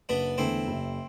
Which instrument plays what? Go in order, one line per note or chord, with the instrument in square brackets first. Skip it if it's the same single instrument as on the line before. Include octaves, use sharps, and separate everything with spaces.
[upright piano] F#1 [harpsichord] B3 D4
[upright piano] E2 D3 A3 [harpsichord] C4 E4
[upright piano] F#1